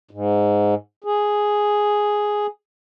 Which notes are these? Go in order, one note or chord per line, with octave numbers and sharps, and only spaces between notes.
G#2
G#4